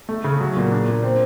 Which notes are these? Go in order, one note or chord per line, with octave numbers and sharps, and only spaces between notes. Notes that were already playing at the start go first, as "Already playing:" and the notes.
A3
C#3
F#3
A#2
D4
A#2
C4